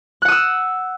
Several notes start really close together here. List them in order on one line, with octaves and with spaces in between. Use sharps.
F#6 F#5 D#6 E6